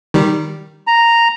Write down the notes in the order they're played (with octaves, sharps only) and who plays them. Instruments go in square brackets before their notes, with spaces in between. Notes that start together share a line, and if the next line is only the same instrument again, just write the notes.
[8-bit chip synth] D#3 G3
[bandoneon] A#5